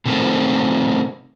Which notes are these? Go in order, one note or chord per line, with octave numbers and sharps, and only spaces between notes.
C3 D#3 G#3 A3 B3 C4